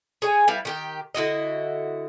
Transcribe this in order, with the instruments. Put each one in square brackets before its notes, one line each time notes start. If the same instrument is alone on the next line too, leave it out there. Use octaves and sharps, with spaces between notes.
[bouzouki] G#4 C#5 G#5
G3 E4 B4 F5
D#3 G4 G5
D3 E4 F#4 D#5